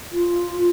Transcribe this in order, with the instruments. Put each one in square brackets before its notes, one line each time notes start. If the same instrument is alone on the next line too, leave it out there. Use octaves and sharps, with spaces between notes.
[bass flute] F4